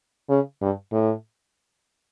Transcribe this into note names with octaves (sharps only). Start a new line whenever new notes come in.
C#3
G2
A2